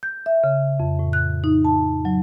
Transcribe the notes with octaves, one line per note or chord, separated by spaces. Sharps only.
G6
E5
C#3
F2
A2
F#6
D#4
A5
F#3